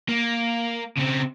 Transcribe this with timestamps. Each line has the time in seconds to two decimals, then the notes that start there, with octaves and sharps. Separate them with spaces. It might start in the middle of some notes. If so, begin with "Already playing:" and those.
0.09 A#3
0.97 C#3 C4